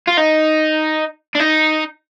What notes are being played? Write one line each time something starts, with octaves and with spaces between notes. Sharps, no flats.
F4
D#4
D4
D#4